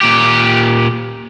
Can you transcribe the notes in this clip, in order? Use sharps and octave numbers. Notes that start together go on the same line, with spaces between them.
A#2 G4